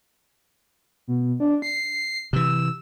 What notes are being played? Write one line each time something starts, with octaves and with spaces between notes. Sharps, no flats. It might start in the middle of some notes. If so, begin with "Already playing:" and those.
B2
D4
C7
C3 E3 E6